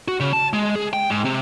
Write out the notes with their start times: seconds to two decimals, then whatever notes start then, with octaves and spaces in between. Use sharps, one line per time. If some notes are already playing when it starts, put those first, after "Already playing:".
0.08 F#4
0.20 C#3
0.33 A5
0.53 G#3
0.75 G#4
0.93 G5
1.10 G#2
1.25 C3